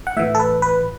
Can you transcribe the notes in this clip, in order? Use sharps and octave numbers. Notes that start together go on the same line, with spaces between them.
F#5
A2 E3 E5
A4
B4
B4